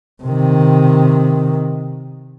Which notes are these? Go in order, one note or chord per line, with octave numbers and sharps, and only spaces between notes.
C3 D#3